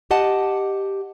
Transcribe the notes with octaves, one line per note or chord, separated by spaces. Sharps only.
G4 D#5 F#5 A5